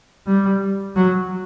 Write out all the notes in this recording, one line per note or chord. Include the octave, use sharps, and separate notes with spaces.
G3
F#3